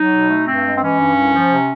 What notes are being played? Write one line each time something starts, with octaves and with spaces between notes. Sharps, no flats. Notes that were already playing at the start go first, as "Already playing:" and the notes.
Already playing: F#3 D#4
B2
A3
G2 C4
G#3
C4
E3 C#4
G2
C2
F3
C3